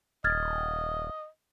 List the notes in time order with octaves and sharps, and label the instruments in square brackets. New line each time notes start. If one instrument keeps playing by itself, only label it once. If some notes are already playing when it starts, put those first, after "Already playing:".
[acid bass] D#1 [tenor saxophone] D#5 [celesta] F6 G#6 A6